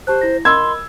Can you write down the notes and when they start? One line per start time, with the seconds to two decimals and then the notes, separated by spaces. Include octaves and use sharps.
0.07 G4 C5 A5 F#6
0.21 E4 A#6
0.45 A#4 D#5 B5 C6 E6 G#6